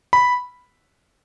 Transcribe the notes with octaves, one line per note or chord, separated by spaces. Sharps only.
B5